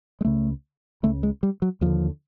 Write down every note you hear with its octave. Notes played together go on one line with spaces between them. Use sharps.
G#3
C#2 C#3 A3
C#2 C#3 A3
G#3
G3
F#3
D#2 D3 F3